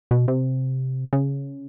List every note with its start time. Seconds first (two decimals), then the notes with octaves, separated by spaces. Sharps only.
0.11 B2
0.28 C3
1.13 C#3